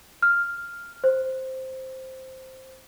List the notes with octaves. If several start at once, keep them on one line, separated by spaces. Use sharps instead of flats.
F6
C5